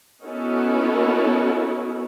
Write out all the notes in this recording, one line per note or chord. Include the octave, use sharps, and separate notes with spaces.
B3 C#4 D#4 E4 F#4 A4